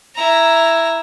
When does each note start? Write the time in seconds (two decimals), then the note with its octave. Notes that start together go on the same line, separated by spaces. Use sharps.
0.15 E4 A#5